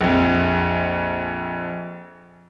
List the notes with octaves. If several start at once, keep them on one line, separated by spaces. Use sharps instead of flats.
A#1 F2